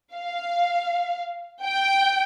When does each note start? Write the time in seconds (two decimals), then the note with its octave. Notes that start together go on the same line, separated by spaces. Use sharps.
0.14 F5
1.63 G5